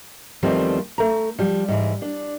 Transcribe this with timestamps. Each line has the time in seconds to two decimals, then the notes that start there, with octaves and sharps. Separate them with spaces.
0.43 E2 D#3 F3 G3 A3 C4
0.98 A3 A#5
1.38 F3 G3
1.68 G#2 E3
2.02 D4